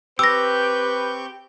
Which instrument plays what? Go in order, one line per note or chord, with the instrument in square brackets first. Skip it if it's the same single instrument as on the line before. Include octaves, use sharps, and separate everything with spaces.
[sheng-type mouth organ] C4 C#6 G6 [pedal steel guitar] G4 [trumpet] B4 [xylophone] E6 A#6